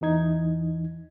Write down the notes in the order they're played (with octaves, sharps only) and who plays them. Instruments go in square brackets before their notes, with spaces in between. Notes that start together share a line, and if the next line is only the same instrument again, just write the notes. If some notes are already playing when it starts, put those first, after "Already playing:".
[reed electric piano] E2 E3 D#4 G#6